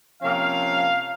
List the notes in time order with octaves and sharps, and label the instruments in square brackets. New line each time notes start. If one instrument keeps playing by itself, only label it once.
[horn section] C3 F3 A#3 C#4 F5